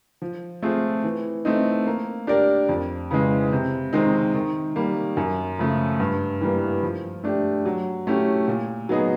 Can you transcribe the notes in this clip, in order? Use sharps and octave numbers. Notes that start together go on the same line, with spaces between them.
F3
A3 C4 F4 G#4
E3
A3 C4 D#4
A#3
D4 G4 A#4 D5
F2
C#3 E3 G#3
C3
D#3 G#3 C4 D#4
D#3
G3 A#3
F#2
C#3 F3 A3
G2
E3 G3 A#3
F3
A3 D4 G4
F#3
A3 C#4 E4 G4
A#2
F#3 B3 D#4 G#4